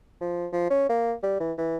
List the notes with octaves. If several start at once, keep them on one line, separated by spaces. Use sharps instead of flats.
F3
F3
C#4
A#3
G3
E3
E3